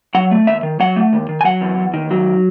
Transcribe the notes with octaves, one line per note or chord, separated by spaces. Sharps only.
F#3 F#5
A3
D#2 E5
D#3
F#3 F#5
A3
D#2
D#3
G#5
F#3 F#5
E2
E2
D#3
F#3